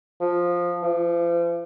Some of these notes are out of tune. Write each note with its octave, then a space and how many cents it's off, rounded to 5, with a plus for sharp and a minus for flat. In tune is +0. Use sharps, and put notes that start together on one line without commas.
F3 +5
F3 -40